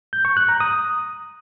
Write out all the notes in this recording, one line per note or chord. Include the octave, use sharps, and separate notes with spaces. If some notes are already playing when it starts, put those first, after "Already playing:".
G6
C#6
F#6
A#5
D#6